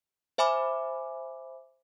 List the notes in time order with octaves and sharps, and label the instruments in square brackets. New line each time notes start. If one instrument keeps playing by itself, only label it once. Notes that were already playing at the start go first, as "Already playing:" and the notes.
[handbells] C5 E5 G#5 B5 D6